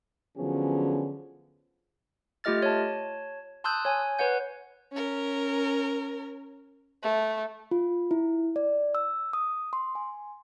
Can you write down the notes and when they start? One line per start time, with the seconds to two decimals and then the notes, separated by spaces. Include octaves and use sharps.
0.37 D3 F3 F#3 B3 C#4 G#4
2.44 A3 F4 G4 D#5 F6 A6
2.62 C#5 A5
3.64 A5 C6 D#6 E6 F#6 G6
3.85 C#5 G#5
4.19 B4 C#5 F#5 G6
4.92 C#4 A#4
7.02 A3
7.71 F4
8.11 E4
8.56 D5
8.95 E6
9.33 D#6
9.73 C6
9.95 G#5